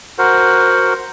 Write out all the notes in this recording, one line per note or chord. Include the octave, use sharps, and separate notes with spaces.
F#4 A#4 C5 F#5